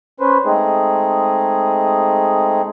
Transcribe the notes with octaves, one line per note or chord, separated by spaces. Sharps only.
C#4 B4 C5
G#3 A3 C4 D#4 G#4